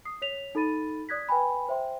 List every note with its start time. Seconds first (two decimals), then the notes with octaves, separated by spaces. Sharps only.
0.05 D#6 C7
0.22 C#5 B6 F7
0.55 D#4 A4 B5 A6 D#7
1.09 D5 D#6 F#6 G#6 A#6 B6
1.29 B4 G5 G#5 B5
1.69 C5 E5 G5 C6